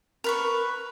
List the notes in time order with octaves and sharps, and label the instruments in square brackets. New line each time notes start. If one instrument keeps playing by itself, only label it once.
[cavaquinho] A#4 B4 C#6